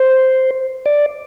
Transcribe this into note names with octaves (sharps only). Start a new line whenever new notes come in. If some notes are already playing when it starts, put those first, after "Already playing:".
Already playing: C5
D5